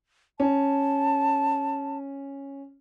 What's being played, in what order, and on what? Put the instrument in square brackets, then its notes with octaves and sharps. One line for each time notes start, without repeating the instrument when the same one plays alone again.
[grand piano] C#4 [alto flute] A5